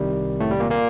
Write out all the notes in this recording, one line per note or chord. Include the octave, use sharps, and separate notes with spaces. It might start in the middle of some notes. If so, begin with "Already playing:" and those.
Already playing: C2 C3 D#3 G3
A2 A3
G3
A#2 A#3
A#2 A#3